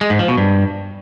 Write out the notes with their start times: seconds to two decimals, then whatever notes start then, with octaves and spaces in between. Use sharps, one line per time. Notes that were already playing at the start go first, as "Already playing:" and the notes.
0.01 G#3
0.10 G#2
0.19 F3
0.28 B2
0.37 G2